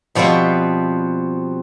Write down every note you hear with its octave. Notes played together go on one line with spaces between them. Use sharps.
B2 F3 G3 B3 C4